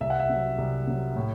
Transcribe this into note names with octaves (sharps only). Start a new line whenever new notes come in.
C2 E5
F#5
E5
C3 F#3
C2
C3 F#3
A2